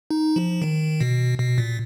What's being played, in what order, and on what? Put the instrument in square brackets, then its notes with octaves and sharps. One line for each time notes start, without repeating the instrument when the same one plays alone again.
[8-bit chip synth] D#4
F3
D#3
B2
B2
A#2